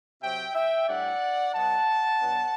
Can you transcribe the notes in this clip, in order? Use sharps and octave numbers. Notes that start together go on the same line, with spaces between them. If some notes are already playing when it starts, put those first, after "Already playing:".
C3 F#3 C4 E5 G5
E5 G5
A2 G3 D4 D5 F#5
B2 F#3 B3 F#5 A5
B2 F#3 B3 D4